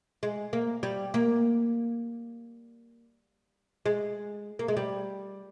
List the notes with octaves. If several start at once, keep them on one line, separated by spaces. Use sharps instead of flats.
G#3
A#3
G3
A#3
G#3
A#3
G#3
G3